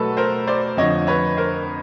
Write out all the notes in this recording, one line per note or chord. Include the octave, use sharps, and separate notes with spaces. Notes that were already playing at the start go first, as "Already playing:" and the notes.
Already playing: B2 F#3 A3 A4 B4
A#4 C5
C5 D5
F2 D3 F3 C#5 D#5
B4 C#5
A#4 C5